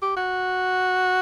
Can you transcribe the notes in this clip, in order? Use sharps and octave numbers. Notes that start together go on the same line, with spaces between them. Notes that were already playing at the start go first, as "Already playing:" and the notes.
G4
F#4